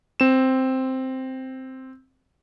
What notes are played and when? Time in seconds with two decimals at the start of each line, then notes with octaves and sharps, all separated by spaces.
0.20 C4 E7